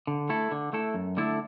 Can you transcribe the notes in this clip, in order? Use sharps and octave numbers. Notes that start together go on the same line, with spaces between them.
D3
A3 E4 A4
D3
A3 E4 A4
F#2
D3 A3 E4 A4